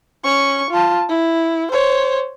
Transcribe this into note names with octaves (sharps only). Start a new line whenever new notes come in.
C#4 C#6
F4 A5
E4
C5 C#5